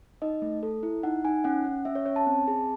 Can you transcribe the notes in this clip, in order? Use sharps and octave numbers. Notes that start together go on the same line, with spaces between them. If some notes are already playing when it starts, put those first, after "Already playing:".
D#4 D#5
A3
A4
E4
D#4 F#5
D#4 G#5
C#4 F#5
C#4
C#4 E5
C#5
C#4 C#5
A5
C4
G#4